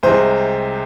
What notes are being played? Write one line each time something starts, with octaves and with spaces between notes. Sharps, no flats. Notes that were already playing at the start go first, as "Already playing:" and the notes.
C2 C3 G#3 C5